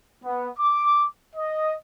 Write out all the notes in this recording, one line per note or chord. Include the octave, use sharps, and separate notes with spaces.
B3
D6
D#5